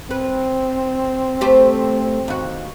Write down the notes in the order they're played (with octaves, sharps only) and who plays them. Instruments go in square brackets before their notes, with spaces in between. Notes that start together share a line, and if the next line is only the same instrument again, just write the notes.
[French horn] C4 [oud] B4
[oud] A3 G4 C5
D#2 F#4